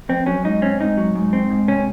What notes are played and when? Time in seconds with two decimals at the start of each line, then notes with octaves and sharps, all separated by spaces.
0.09 F2 C4
0.26 F#3 C#4
0.44 G#2 D#4
0.62 C4 C#4
0.79 G#2 D#4
0.97 F#3
1.15 G#2
1.33 C4
1.51 G#2
1.68 C3 C#4